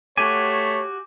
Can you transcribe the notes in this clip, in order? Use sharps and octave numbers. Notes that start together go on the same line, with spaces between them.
A3 F#4 G4 C#5 G#5 D6